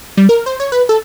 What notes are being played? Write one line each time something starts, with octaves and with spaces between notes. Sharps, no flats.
G3
A#4
C5
C#5
B4
A4